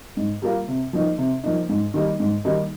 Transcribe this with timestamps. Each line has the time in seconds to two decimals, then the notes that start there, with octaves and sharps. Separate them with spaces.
0.17 G#2
0.42 G3 A#3 F4 A#4
0.68 C3
0.93 F3 A#3 D#4
1.18 C3
1.43 F3 A#3 D#4
1.69 G#2
1.94 D#3 G3 A#3 D#4
2.20 G#2
2.45 D#3 G3 A#3 D#4